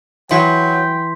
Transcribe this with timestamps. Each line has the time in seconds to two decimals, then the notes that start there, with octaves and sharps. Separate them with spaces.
0.31 E3 F#3 G5 C6 G6 B6